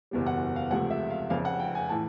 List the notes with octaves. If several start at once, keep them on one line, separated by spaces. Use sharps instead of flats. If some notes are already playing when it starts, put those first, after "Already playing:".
F#1 E2 B2 G3
F#5
F5
C#2 C3 F3 A3 F#5
E5
F5
F1 F2 C#3 F5
F#5
G5
G#5
A2 E3 A5